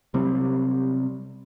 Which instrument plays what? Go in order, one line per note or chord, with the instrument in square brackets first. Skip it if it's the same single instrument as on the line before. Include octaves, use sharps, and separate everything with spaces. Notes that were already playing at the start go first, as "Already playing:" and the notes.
[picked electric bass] C3 F#3 G3 C4